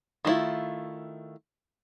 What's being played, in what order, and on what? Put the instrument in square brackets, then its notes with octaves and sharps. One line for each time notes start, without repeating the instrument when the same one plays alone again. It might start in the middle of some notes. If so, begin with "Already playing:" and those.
[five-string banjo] D#3 A3 B3 E4 F4